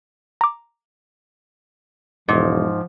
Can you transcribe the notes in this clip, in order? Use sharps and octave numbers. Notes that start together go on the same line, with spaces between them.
A#5 D6
E1 G#2 F3